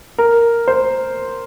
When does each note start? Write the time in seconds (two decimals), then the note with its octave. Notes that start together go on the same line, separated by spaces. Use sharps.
0.18 A#4
0.68 C5